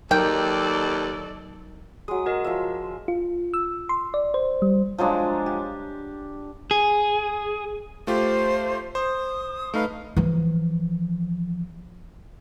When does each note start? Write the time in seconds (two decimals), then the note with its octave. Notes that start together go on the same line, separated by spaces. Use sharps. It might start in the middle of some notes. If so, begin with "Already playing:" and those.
0.11 D#2 F#3 D#4 A4 A#4 D5 G5
2.08 F#3 G#3 D#6
2.26 F#4 A#4 D#5
2.44 F3 E5
3.08 F4
3.54 E6
3.89 C6
4.14 D5
4.34 C5
4.62 G3
4.98 F3 F#3 G#3 D4
5.46 G4
6.71 G#4
8.07 A3 F4 G4 C5
8.95 C5 D#6
9.74 A3 D#4 B4 F5
10.17 E3 F3